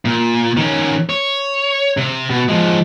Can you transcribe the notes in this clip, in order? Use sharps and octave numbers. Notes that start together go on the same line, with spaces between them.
A#2
D#3 C#4
C#5
C3
B2
F3 G#3